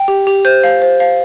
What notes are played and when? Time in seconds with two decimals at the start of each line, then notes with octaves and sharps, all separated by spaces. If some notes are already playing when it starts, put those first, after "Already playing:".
Already playing: G5
0.08 G4
0.27 G4
0.45 C5 G6
0.64 F5
0.82 C5
1.00 F5